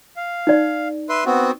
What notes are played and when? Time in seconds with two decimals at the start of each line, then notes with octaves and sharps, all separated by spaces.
0.16 F5
0.47 D#4 D5
1.09 B4 E5 C6
1.25 B3 C4 F#4